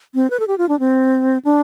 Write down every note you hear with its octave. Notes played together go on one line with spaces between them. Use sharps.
C4
B4
A4
G4
F4
D4
C4
D4